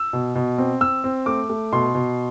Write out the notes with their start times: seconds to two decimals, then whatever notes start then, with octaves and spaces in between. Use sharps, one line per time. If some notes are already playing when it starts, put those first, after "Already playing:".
Already playing: E6
0.13 B2
0.35 B2
0.58 C4
0.81 C4 E6
1.04 C4
1.26 A3 D6
1.50 A3
1.73 B2 C6
1.95 B2